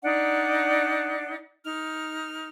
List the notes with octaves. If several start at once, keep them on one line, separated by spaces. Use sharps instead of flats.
D4 D#4 D5 F#5
D#4 F6